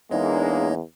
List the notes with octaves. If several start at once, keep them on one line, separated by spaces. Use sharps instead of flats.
E2 G#3 A#3 D4 D#4 C#5 D#5